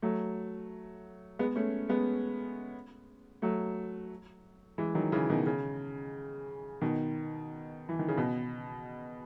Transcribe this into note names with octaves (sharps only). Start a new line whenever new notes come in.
F#3 A3
G#3 B3
A3 C#4
G#3 B3
F#3 A3
E3 G#3
D#3 F#3
C#3 E3
B2 D#3
C#3
B2 D#3
E3
D#3
C#3
B2